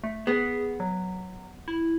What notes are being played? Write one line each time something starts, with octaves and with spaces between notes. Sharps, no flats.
A3
B3 G#4
F#3
E4